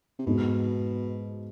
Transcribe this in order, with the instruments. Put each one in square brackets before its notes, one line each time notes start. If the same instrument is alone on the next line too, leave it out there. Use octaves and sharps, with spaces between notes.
[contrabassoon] C3
[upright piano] G#2 G#3 B3 [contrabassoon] B2